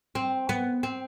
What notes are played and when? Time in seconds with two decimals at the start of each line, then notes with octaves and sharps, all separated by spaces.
0.15 C4
0.49 B3
0.83 C4